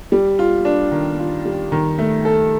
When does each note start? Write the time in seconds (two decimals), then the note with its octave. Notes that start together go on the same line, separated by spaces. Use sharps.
0.12 G3
0.39 F4
0.65 D4
0.92 D#3
1.19 F4
1.45 G3
1.72 D#3
1.98 A3
2.25 A4